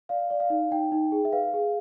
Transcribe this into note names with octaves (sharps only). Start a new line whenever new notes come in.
D5 F5
D5
F5
D#4
D#4 G5
D#4
G#4
E5
B4 F5
G#4